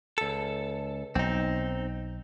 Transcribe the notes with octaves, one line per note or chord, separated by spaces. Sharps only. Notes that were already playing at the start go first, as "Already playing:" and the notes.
C#2 A4
B1 C4 D#4